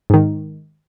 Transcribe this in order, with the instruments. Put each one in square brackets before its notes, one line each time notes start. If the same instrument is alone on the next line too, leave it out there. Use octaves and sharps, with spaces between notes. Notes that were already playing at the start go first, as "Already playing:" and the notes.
[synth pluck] G#2 D#3